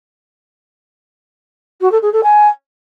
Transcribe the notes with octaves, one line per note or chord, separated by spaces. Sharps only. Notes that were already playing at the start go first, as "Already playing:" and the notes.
F#4
A4
G#4
A4
G#5